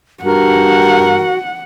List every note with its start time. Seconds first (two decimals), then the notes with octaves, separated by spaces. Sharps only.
0.24 G2 F#4 A#4 F#5